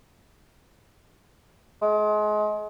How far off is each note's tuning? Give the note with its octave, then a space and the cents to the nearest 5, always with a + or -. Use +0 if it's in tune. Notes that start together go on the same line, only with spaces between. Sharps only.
G#3 +30